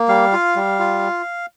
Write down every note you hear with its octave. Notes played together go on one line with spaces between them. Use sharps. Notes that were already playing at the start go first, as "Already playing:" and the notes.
Already playing: A#3
G3 F5
F4
G3
F4